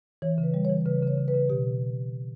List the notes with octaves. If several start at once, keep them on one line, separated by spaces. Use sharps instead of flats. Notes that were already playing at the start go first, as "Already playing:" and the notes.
E3 C#5
C#3
B4
G3
C#5
E3
C#3 B4
C#3
C#5
C#3
B4
C#3
B2 G4